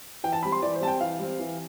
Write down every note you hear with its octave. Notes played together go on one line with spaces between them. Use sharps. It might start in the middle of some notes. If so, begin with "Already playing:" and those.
E3 G5
A5
G3 C4 B5
C6
E3 D5
C5
G3 C4 A5
G5
E3 F5
G3 C4
E3